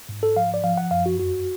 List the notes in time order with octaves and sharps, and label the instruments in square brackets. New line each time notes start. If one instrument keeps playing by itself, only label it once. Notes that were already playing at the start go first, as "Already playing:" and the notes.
[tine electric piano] G#2
A4
F3 F5
D5
F3 F5
F#5
F#2 F5
F#4
F2 F#4